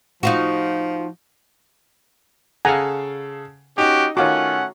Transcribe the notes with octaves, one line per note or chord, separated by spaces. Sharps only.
F3 D#4 F4 F#4
C#3 A4 F5 F#5 G#5 A#5
C#4 D#4 F#4 G4
D#3 A3 C#4 F4 F#4 C#5 F#5 D6